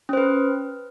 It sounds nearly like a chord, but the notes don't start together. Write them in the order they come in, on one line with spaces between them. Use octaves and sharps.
C#4 C5 B4